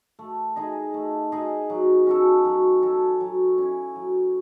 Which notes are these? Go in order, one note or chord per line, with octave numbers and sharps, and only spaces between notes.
A3
D#4 G#4 D#5
A3
D#4 G#4 D#5
F#3
C#4 F#4 A4
F#3
C#4 F#4 A4
F#3
C#4 E4
F#3